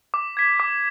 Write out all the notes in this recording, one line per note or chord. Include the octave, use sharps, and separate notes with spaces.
D6
G#6 B6
D6